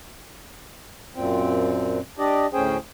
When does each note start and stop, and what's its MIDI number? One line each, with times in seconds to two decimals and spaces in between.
1.15 1.99 42
1.15 1.99 46
1.15 1.99 60
2.19 2.46 62
2.19 2.46 67
2.19 2.46 74
2.19 2.46 75
2.53 2.77 38
2.53 2.77 45
2.53 2.77 61
2.53 2.77 68
2.53 2.77 72
2.53 2.77 79